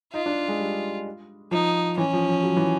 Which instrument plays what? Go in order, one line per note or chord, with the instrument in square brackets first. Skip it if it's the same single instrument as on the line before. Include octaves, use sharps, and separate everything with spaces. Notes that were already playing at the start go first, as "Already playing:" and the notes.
[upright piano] D#4 [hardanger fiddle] F4
[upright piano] D4
G#3
G3
[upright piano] F3 [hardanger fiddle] D#4
[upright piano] E3 [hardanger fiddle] C#4
[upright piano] F3
F3
F#3
E3